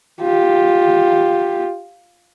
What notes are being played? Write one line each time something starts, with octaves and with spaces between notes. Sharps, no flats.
F4 G4